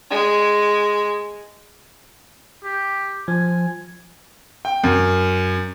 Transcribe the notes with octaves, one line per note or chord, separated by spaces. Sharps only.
G#3
G4
F3 G#5
G5
F#2